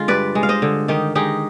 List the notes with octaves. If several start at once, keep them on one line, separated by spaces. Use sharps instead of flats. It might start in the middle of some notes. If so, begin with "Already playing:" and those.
Already playing: D3 G#3 F4
G2 B4 D5
G#3
F5
C5 D#5
D3
D#3 D#4 G4
G#3 D#4 G4